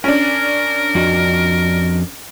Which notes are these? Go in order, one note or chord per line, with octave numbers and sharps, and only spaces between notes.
C#4 D4 A#4
F2 F#4 D#5